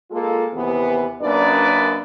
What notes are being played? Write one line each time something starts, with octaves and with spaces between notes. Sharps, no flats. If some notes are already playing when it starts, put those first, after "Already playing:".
G#3 A#3 F4 A4
D#2 C3 E3 B3
F#2 A#3 D4 D#4 B4 D5